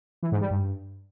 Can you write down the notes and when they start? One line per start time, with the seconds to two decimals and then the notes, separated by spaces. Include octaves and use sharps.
0.23 E3
0.32 G#2
0.41 G3
0.51 G2